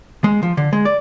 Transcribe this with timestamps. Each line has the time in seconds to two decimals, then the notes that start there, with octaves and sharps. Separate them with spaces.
0.24 G#3
0.43 F3
0.57 D3
0.73 G#3
0.85 D5